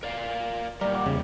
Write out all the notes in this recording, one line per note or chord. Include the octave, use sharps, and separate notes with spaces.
A#4 D5 F5
A#2 G3 A#4 D5
F#5 D6
E2 C#3